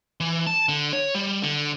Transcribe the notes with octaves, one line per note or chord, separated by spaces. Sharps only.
E3
A5
D3
C#5
G3
D3